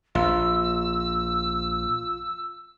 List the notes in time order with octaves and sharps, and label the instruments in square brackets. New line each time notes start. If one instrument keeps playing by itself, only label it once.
[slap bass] A#1 [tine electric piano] F4 [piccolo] E6